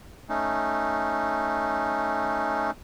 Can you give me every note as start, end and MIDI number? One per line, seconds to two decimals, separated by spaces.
0.29 2.71 57
0.29 2.71 61
0.29 2.71 63